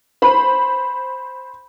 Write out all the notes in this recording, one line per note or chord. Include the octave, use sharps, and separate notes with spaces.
C5 B5